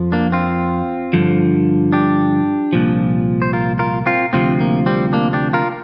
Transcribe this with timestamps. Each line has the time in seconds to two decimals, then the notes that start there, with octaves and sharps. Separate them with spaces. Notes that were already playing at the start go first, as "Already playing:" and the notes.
Already playing: F2 F3
0.12 A#3 D4
0.32 C4 F4
1.13 G2 D3 F3
1.93 D4 G4
2.73 C2 A#2 F3
3.42 C5
3.53 F4 A#4
3.79 F4 A#4
4.06 C4 F4
4.33 D2 C3 F3 C4 F4
4.60 A#3
4.86 G3 C4
5.13 A#3 D4
5.33 D4 G4
5.53 F4 A#4